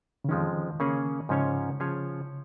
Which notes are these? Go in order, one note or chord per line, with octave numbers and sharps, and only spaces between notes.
C#3
F2 D#3 F3 G#3 C#4
C#3 A#3 C#4 G#4 C#5
G#2 C#3 F3 C#4 G#4 C#5
F3 C#4 G#4 C#5